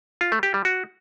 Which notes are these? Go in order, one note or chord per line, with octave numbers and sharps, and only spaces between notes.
F4
A3
G4
G3
F#4